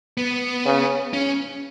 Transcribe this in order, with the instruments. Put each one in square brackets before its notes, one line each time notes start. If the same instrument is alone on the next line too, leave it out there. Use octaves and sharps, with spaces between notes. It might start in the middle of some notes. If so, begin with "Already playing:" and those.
[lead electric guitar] B3
[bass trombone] C#3
[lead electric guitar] C#4